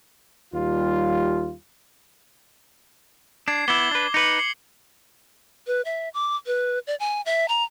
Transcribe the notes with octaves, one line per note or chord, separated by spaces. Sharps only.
D#2 G3 F4
D4 G#6 C7
B3 E4 D6 G7
D4 B4
D#4 B4 C#7 F#7
C7
B4
E5
D6
B4
D5
G#5
E5
A#5